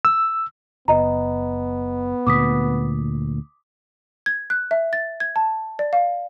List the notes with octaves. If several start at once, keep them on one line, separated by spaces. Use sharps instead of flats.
E6
F#1 B3 D#5 A#5
D2 A#2 D6 D#6 B6
G#6
F#6
E5
A6
G#6
A5
D5
F5